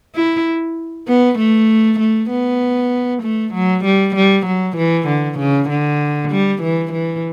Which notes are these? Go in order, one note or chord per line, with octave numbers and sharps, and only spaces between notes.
E4
B3
A3
A3
B3
A3
F#3
G3
G3
F#3
E3
D3
C#3
D3
G3
E3
E3